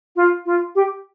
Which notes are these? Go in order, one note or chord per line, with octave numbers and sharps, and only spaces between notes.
F4
F4
G4